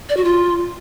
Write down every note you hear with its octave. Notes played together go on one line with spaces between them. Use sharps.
D5
F#4
F4